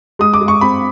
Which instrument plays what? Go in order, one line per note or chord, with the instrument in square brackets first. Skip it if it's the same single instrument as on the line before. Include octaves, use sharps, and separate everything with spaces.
[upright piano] G#3 D#6
D6
G#3
C#6
C4 B5